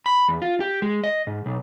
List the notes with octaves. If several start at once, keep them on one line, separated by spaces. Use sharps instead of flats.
B5
E2
F4
G4
G#3
D#5
G#2
B1